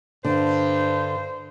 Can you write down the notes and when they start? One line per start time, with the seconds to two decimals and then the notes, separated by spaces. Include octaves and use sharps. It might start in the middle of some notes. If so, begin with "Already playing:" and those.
0.25 G2 D3 C5